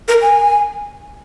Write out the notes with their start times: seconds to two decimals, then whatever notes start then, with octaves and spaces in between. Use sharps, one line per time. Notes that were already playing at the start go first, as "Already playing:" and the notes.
0.08 A#4
0.22 G#5